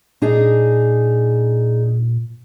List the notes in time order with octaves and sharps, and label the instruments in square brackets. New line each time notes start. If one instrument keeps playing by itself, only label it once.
[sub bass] A#2 [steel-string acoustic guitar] D4 D#4 G#4